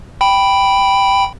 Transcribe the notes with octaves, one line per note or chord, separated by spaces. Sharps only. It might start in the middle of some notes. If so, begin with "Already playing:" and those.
G5 B5